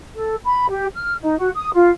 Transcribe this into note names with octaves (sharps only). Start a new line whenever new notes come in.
A4
B5
G4
F6
D#4
F#4
D#6
F4